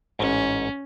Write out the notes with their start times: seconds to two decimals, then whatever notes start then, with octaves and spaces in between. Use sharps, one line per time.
0.19 A1 G#2 C#4